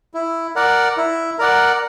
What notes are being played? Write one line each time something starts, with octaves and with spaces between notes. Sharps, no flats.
E4
A#4 D5 F#5
E4
A#4 D5 F#5